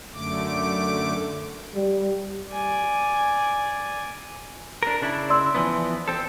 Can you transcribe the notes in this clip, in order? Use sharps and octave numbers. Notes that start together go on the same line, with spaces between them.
F#2 D3 A3 D6
G3
D5 G#5
D4 A#4
C#3 D4 E4
D5 C6 E6
E3 F3 B3
C4 A4